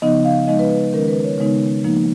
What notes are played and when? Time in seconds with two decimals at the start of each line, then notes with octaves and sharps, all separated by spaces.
0.02 C#3 F3 B3 D#4 D#5
0.25 F5
0.47 F3 G#3 D#4 D#5
0.59 B4
0.70 B4
0.93 D#3 G#3 C#4 A#4
1.08 B4
1.24 C#5
1.38 C#3 G#3 B3 D#4 C#5
1.84 F3 A#3 D#4